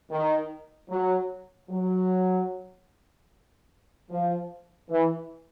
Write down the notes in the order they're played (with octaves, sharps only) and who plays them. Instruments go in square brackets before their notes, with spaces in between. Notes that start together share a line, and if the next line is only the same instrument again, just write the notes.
[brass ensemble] D#3
F#3
F#3
F3
E3